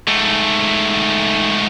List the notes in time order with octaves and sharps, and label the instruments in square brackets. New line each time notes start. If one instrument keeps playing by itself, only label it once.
[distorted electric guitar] G#2 A3